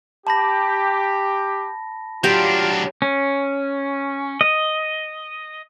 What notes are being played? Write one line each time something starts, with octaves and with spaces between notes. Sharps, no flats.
G4 A5 B5 A#6
F#3 D4 F4 G4
C#4
D#5